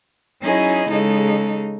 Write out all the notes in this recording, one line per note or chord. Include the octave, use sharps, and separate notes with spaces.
F#3 C#4 D#4 E4 G#4 D#5
C#3 G#3 D#4 A4